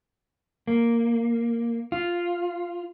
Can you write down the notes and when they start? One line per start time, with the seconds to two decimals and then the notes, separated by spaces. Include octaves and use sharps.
0.67 A#3
1.92 F4